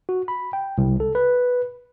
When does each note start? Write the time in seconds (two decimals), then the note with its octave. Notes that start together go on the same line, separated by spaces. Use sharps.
0.09 F#4
0.28 B5
0.53 G5
0.78 C2
1.00 A4
1.15 B4